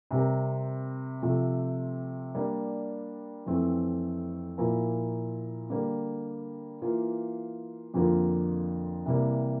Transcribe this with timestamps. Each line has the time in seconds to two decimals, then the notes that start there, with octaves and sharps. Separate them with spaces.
0.11 C3 G3 C4 G4 A#4
1.22 C3 F3 A3
2.35 G3 A#3 D4
3.46 F2 E3 A3 C4
4.58 A#2 F3 A#3 E4 A#4
5.70 D3 G3 A#3
6.82 E3 A#3 F4
7.94 F2 D3 F3 A#3 F4
9.06 C3 E3 G3 A#3